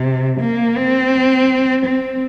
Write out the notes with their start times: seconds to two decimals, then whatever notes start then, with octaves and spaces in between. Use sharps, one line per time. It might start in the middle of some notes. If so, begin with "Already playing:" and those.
Already playing: C3
0.40 A#3
0.76 C4
1.86 C4